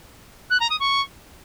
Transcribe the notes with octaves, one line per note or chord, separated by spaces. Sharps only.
F#6
A#5
D#6
C#6